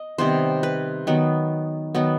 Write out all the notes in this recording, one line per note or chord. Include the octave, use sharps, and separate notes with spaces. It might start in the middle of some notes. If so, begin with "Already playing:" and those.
Already playing: D#5
C3 D#3 G3 B3 C5
B4
D#3 F#3 B3
D#3 F#3 B3